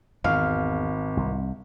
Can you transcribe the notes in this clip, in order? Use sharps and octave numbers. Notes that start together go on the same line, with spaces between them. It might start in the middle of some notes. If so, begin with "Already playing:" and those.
G#1 E2 F5
C2